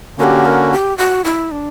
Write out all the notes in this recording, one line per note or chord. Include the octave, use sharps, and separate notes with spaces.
D3 A#3 C#4 F#4 G4 A#4
A#4
G4
F#4
E4
D4